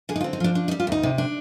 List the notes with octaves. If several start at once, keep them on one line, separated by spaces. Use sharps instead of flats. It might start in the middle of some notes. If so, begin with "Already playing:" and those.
D3 G#4
D#4
F4
C4
D#4
F3 D4
D4
D#4
G3
F4
D2 D#4
C3
D4